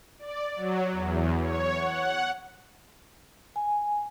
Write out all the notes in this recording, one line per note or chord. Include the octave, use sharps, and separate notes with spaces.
D5
F#3
E2
C#5
F#5
G#5